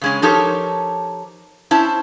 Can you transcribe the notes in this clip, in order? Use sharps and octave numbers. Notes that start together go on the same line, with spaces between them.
C#3 G#3 C#4
F3 D#4 G4 A4 A#4 C#5
C#4 E4 C5 A5